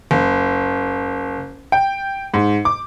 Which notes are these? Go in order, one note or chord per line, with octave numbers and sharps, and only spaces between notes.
F#1
G5
G#2
D6